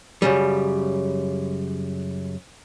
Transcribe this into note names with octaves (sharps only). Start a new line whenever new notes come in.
F#2 C#3 G3